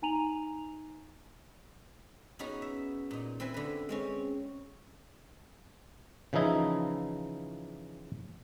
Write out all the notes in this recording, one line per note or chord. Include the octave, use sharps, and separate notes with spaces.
D#4 G#5 A#5 D#7 F7 F#7
B3 C#4 D#4 F#4 G#4
E5
A#2 D#4
C4 E4 B4 G#5
D3 B4
G#3 C4 C#4
C#3 E3 F3 D#4 E4